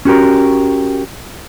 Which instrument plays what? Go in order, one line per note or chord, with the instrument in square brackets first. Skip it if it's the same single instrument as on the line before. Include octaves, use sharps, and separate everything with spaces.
[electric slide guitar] C#4 F#4 G4 A#4